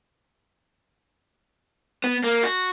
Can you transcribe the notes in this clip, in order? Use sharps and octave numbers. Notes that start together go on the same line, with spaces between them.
B3
A#3
F#4